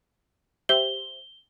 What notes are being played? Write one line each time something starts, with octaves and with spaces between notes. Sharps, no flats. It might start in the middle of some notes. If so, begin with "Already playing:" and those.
G4 C5 E5 G7